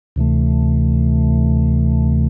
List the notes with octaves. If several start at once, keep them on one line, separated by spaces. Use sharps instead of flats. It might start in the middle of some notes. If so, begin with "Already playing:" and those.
D2 C3 E3 A3